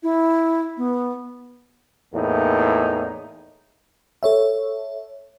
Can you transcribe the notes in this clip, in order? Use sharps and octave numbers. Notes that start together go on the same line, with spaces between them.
E4
B3
E2 A2 A#3 D#4
A4 C#5 E5